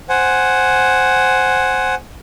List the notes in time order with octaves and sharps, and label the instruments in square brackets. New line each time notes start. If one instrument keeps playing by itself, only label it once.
[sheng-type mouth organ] C5 F#5 G#5